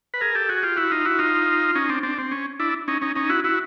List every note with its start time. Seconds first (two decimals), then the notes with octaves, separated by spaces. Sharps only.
0.14 B4
0.21 G#4 A#4
0.35 G4 A4
0.49 F#4 G#4
0.63 F4 G4
0.77 E4 F#4
0.91 D#4 F4
1.05 E4 F#4
1.19 D#4 F4
1.75 C#4 D#4
1.89 C4 D4
2.03 C4 D4
2.18 C4
2.31 C#4
2.60 D4 E4
2.88 C#4 D#4
3.02 C#4 D#4
3.15 C#4 D#4
3.29 E4 F#4
3.44 E4 F#4